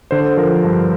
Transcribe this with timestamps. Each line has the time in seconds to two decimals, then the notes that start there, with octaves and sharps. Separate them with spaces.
0.11 D3 C5
0.37 F3 A#4
0.64 G2